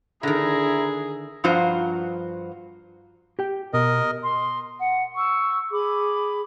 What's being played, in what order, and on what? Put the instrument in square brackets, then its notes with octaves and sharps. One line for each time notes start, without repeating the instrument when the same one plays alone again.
[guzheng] D3 D#3 [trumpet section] E4 A#5 [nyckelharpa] G#4
[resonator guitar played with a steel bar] G2 F3 F4 F#4 C5 A#5
[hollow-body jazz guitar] G4 G5
[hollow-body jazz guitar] B2 [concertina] A#4 D#5
[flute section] C6
F#5
C#6 E6
G#4 B5 D6